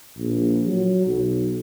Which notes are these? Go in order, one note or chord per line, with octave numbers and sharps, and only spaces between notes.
A#1
F#3
B1